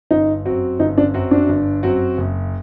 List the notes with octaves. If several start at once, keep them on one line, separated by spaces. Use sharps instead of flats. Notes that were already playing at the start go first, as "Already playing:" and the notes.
G1 D#4
F#2 F#3 C4 F#4
G1 D#4
D4
F#2 F#3 C4 F#4
D4
G1
F#2 F#3 C4 F#4
F#1